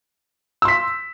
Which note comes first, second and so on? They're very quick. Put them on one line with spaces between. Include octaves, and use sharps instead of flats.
E6 C6 B6